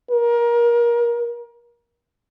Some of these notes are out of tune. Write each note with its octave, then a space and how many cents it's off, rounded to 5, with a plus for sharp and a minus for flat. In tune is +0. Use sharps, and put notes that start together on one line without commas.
A#4 +25